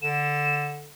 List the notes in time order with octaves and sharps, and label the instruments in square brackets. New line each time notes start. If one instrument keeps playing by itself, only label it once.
[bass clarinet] D3 [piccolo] E7